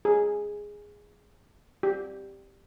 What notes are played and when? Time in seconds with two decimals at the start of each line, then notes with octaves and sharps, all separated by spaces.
0.05 G#4
1.83 G4